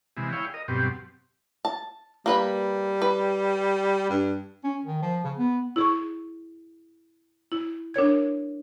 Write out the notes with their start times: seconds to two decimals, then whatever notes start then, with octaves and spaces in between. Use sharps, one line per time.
0.17 C3 E3 G#3
0.32 E4 G#4 C#5 F5 G5
0.54 A#4 D#5
0.68 G2 B2 F#3 C4 G4
1.65 A5
2.26 G3 A#3 B4 B5
3.02 B4
4.09 G2
4.64 C#4
4.85 D#3
5.02 F3
5.24 C#3
5.38 B3
5.76 E4 G#4 C#6
7.52 E4
7.94 D4 A#4 C#5 G#6